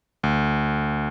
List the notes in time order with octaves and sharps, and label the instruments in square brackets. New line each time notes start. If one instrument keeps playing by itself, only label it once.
[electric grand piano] D2